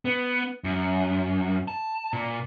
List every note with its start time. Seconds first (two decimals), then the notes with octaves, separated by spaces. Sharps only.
0.05 B3
0.64 F#2
1.68 A5
2.13 A#2